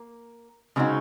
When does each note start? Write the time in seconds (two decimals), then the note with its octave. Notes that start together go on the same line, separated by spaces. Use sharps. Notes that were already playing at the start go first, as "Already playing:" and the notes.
Already playing: A#3
0.76 C#3 G#3 C4 D#4 F#4